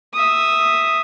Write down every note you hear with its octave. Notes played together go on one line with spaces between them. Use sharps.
E5 D#6